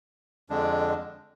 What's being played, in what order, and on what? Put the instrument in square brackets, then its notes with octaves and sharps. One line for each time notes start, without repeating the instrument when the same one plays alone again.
[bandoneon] F2 D3 G#3 D4